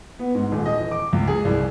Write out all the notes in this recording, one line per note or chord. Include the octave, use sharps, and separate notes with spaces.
B3
G#2
D#1
D#5
E3
D6
C#2
G#4
C2